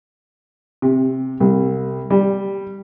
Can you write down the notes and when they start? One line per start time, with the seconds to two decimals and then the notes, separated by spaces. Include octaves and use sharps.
0.82 C3
1.40 C2
2.11 G3